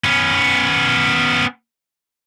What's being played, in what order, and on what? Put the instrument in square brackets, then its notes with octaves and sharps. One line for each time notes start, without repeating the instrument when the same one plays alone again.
[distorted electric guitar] B3 C#4